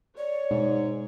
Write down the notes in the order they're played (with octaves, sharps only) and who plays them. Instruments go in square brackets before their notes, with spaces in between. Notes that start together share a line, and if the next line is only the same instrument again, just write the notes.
[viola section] C#5 [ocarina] D5
[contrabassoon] G#2 [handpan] B2 D#4